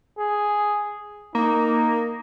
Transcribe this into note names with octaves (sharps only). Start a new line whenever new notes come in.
G#4
A#3 D#4